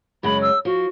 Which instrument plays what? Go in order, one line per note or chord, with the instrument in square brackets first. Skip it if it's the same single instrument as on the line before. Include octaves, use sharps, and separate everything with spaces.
[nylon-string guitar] F#2 C#3 G#3 [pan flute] B5
[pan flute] E6
[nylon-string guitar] F3 [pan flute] F#4